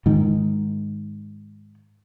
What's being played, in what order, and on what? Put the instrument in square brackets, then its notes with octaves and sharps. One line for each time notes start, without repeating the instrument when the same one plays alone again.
[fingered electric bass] G#2 D#3